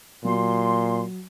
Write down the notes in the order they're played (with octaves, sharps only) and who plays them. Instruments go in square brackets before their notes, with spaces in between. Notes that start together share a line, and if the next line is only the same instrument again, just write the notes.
[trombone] A#2 [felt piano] F#3 [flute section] C6